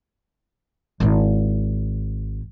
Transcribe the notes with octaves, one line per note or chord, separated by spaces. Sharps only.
G#1 E4